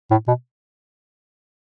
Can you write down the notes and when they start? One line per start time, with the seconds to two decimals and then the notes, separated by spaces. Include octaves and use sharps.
0.11 A2
0.28 B2